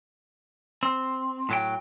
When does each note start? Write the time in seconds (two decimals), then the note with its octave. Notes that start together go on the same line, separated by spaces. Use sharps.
0.83 C4
1.49 A2 F#3 G5